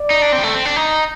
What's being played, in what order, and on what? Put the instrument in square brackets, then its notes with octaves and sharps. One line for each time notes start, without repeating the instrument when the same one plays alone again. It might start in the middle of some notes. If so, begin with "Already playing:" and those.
Already playing: [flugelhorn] D5
[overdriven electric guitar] D#4
D4
C4
G3
A3
C4
D4
D#4